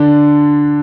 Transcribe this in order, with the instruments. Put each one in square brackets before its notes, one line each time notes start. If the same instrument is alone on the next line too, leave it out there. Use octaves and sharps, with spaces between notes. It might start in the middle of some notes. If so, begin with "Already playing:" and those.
Already playing: [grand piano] D3 D4